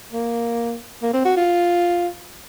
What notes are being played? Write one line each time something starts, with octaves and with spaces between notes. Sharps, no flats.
A#3
A#3
C4
F#4
F4